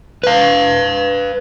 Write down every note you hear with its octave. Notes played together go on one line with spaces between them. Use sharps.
B4 F5